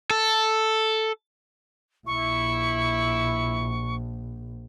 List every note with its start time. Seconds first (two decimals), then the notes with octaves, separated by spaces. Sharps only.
0.10 A4
2.07 A#1 E4 C#6